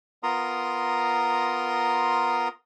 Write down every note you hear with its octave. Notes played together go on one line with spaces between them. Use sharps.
B3 F4 A#4 A#5 C6 D#6